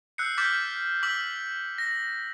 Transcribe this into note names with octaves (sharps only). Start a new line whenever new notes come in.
E6 F#6 G6 C7 C#7
D6 F6 G6 A6 B6
D6 E6 F6 B6 C7 F#7
A#6